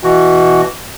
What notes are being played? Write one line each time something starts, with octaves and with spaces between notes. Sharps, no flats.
B2 E3 F#4